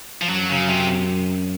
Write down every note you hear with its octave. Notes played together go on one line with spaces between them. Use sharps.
F3
F#2 F#3
C#3
C3